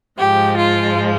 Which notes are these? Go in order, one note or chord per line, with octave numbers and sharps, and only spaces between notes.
G#2 F3 G#3 G4
F4